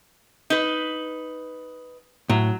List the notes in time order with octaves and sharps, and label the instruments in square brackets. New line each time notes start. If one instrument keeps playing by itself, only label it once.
[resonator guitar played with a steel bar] D#4 B4
[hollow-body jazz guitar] A2 [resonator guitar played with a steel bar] F#3